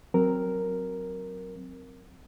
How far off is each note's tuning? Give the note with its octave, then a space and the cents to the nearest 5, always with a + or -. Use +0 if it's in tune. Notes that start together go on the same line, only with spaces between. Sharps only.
F#3 +0 C4 +0 A#4 +0